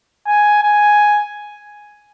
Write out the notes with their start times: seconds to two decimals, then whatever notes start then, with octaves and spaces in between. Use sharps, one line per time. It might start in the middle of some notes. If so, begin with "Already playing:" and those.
0.27 G#5
0.63 G#5